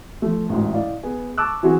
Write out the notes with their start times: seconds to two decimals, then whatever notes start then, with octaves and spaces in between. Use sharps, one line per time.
0.22 F3 A3
0.49 A1 D2 G#2
0.74 E4 D5 D#5 F5
1.03 B3 G#4
1.38 A5 C#6 D6 E6 F#6
1.63 E3 F#3 C4 E4 F#4 G#4